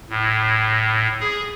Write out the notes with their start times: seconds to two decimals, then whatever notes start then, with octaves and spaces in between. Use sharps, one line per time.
0.10 A2
1.20 G#4